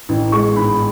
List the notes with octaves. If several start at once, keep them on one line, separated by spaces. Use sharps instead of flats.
A1
G#3 C#6
G#2 B5